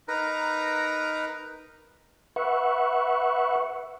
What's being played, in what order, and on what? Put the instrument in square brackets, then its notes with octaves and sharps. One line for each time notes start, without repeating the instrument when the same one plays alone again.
[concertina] D#4 A#4 B4 A#5
[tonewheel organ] B4 E5 F#5 C#6